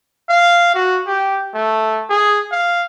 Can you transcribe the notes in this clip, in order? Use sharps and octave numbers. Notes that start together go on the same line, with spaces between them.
F5
F#4
G4
A3
G#4
F5